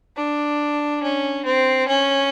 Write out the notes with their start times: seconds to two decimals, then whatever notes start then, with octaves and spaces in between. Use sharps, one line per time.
0.16 D4
1.03 C#4
1.45 C4
1.88 C#4